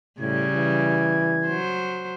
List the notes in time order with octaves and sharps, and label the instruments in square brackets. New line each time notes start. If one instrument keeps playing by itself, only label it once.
[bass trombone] A2 [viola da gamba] C#3 G3 [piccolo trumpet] G#6
[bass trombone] E3
[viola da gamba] F#3 C5